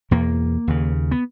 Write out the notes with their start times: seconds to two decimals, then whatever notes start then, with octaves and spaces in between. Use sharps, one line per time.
0.11 E2 B2 A#3
0.67 D#2 C#3
1.11 B3